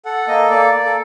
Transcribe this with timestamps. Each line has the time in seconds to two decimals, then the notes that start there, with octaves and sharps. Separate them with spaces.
0.05 A4 F#5
0.28 A#3 D#5
0.51 A#3 D5
0.75 A#3
0.85 A4